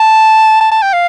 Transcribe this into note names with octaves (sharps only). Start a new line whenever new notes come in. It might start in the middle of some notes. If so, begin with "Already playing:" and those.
Already playing: A5
A5
A5
G5
F5